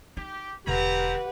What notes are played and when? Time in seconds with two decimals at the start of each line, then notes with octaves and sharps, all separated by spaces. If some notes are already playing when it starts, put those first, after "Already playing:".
0.17 D#4 G4
0.67 E1 D3 C4 E4 G4 B4 F#5 A#5